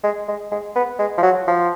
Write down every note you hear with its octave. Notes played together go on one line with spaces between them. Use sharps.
G#3
G#3
G#3
B3
G#3
F3
F#3
F3